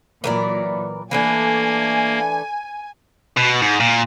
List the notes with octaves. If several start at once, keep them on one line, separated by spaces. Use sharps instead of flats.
A#2 E3 F#3 A#4 D5
E3 A3 A#3 D4 G#5
B2
G#2
A#2